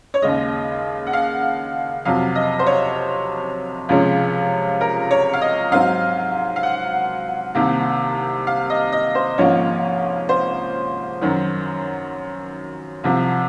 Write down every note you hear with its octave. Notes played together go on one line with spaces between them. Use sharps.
C#5
D#2 C#3 G#3 D#5
F#5
F5
F2 C3 F#3 F5
D#5
C5
C#5
C#2 C3 F3 G#3 C#4
A#4
C#5
F5
D#5
G#2 F#3 C4 F5
F5
F#5
C2 C3 D#3 A#3
F5
D#5
D#5
C5
G#1 G#2 F3 A#3 C#4 C#5
C5
F#2 D#3 F#3 C#4
C2 C3 F3